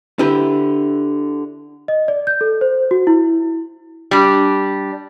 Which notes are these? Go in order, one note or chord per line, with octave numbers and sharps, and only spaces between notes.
D3 E4 G4 B4
D#5
D5
G6
A4
C5
F#4
E4
G3 D4